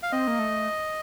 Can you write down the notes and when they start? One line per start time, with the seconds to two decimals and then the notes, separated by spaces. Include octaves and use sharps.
0.03 F5
0.12 C4 D#5
0.27 A#3
0.39 A3